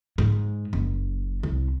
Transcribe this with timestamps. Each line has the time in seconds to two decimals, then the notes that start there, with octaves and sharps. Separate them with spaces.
0.18 G#2
0.73 F#1
1.43 C2